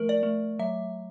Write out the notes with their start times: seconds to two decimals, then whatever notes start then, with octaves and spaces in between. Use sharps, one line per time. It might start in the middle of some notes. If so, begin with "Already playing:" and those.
Already playing: F3 A3 A#4
0.09 D5
0.23 A3
0.59 F#3 E5